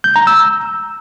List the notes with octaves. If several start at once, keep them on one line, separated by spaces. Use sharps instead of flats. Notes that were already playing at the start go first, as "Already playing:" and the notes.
G6
A#5
E6